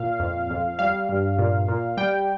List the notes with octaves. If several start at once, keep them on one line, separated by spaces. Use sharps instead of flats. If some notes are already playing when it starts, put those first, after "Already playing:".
Already playing: A#2 F5
F2
F2
G3 F5
G2
A#2
A#2
G3 G5